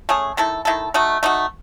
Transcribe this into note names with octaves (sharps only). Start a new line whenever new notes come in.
A3 C#4 G#4
D#3 A3 E4 A4
D#3 A3 E4 A4
A3 D#4 F#4
A3 D#4 F#4